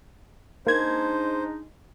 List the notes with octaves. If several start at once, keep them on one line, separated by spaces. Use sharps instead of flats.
G#3 A#3 D4 D#4 C5 G#6